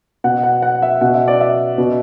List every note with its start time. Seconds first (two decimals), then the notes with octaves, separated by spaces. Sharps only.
0.24 B2 F#5
0.44 F#5
0.63 F#5
0.82 E5
1.01 B2 F#5
1.14 E5
1.28 D5
1.41 E5
1.78 B2